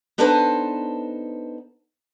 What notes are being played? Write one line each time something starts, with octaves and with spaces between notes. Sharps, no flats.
B3 D4 D#4 A4 B4 C5